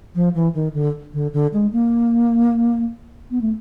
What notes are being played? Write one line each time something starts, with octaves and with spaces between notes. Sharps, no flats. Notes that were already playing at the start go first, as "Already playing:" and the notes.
F3
E3
D#3
D3
D3
D3
G#3
A#3
B3
A3